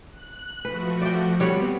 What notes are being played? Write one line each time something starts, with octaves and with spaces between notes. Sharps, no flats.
F#6
F3 A3 F#4 B4
D5 G5
G3 B3 C4 C#5 F#5